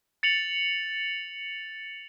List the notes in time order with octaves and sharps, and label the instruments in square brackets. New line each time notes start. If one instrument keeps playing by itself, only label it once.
[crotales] A6 C#7 F7 F#7